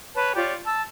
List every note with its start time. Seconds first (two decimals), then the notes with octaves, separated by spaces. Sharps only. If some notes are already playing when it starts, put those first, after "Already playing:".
0.15 B4 C#5 A5
0.35 F4 G4 C#5 D5
0.65 A5 E6